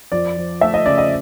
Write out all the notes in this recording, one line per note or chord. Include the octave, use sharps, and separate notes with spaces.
F2 D5
F3
A3 E5
D#5
C#3 D5
D#5